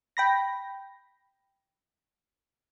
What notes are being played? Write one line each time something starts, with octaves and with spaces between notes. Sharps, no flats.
G5 B5 A#6